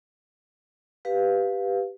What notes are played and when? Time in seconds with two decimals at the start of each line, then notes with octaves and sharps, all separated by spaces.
1.05 G4 B4 F5